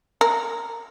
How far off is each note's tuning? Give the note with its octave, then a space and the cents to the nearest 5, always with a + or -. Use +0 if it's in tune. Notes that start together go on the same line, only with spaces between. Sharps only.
A#4 -5